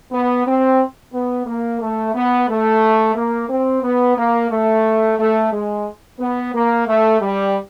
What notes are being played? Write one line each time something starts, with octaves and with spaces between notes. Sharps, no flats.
B3
C4
B3
A#3
A3
B3
A3
A#3
C4
B3
A#3
A3
A3
G#3
B3
A#3
A3
G3